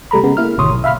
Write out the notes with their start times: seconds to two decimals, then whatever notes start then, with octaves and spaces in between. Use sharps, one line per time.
0.11 C3 G3 A3 A#5 B5
0.23 C#3 G#3 B3
0.37 A#3 E4 F6
0.58 G#1 D2 B2 C#5 C6 D#6
0.72 B1
0.84 E5 F5 B5 F6